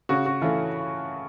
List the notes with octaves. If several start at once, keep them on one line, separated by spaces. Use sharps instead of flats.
C#3 F#4
F#4
E3 A3 C#4 F4